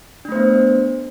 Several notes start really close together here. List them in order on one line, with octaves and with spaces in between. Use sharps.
D4 A3 C5 B3